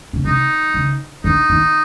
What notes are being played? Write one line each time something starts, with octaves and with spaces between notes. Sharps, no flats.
C#3
C3 D#4
C#3
D3 D#4
D#3